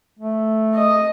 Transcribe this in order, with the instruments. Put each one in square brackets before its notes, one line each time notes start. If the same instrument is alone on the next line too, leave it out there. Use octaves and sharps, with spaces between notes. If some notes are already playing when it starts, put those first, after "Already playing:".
[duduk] A3
[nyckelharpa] D#5